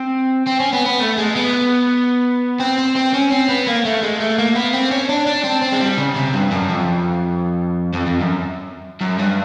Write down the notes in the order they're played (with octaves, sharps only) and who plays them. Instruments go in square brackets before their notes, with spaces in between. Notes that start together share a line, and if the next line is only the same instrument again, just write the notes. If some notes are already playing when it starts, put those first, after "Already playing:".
Already playing: [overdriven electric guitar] C4
C4
C#4
B3
B3
A3
G#3
B3
C4
C4
C4
C#4
C4
B3
A#3
A3
G#3
A3
A#3
B3
C4
C#4
D4
D4
C4
C4
G#3
G3
C#3
C3
G2
F#2
F2
F2
F2
F#2
F#2
G2